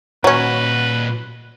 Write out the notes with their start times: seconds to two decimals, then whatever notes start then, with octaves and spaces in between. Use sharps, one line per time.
0.24 A#2 F#3 C#4 B4 D#5